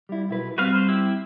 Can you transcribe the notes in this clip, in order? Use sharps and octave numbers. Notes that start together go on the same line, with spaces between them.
G3 E4
B1 E4 B4
G3 C4 F#4 B4 F5
C5
E4 G4